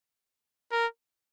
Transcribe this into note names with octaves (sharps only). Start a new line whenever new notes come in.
A#4